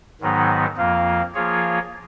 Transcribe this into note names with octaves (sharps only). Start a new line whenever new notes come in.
G#2 D#3 F#3 B3 D#4
F2 F3 A#3 F4
F3 A#3 F4 G#4 C#5